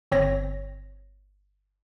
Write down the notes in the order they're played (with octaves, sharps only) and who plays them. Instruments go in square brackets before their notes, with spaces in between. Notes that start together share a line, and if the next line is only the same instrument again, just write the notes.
[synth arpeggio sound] G1 C4 C#5 A#6